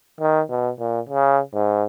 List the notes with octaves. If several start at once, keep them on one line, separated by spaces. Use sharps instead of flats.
D#3
B2
A#2
C#3
G#2